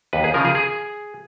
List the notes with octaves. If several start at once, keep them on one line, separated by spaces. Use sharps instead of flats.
D#2 B4
G#4
C#3 F3 A#4
G#4
G#4